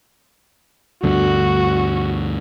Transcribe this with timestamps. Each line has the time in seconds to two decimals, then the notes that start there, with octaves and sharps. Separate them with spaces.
1.03 D2 G2 D3 F#4